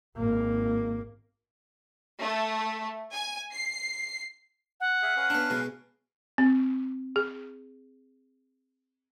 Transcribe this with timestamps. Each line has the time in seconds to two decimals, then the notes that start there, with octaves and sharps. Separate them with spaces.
0.18 G#1 A#3
2.20 A3
3.13 G#5
3.52 C7
4.80 F#5
5.02 G#4 E5 F5
5.16 C#4 B4 F5
5.30 B3 D4
5.50 B2 G#3
6.38 C4
7.16 G#4